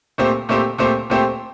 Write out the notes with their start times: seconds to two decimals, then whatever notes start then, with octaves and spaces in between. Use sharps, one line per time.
0.18 A#2 A3 C4 G4 C5
0.49 A#2 A3 C4 G4 C5
0.78 A#2 A3 C4 G4 C5
1.10 A#2 A3 C4 G4 C5